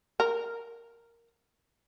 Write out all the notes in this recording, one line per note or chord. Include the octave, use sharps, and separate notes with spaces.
A#4